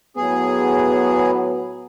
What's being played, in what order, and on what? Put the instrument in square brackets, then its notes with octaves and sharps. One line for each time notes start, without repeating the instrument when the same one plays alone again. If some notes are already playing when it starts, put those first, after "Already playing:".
[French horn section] A2 F#3 B3 [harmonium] G#4